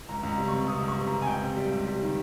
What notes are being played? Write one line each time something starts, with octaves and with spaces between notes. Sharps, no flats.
C#2 A#5
C#2 A#5
G3
C3 C#6
C3 D#6
C#2
C#6
C3
A#5
C3
G#5
C#2 G5
C3
G3
C#2
G3
D#3